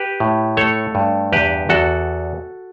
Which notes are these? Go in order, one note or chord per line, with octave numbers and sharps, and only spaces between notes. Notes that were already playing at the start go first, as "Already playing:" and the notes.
Already playing: G4 B4
A2
A3 A4 C#5
G2
E2 G4 B4
E2 F#4 A4